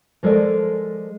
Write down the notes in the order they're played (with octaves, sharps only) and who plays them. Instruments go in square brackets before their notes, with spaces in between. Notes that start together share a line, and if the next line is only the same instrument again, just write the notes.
[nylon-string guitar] F3 G#3 A4 A#4 D5